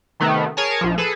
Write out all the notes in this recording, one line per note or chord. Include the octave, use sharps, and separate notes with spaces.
C3 D#3 A3 B3
G#4 A#4 C#5 G#5 A5
A#1 F3
G#4 A4 B4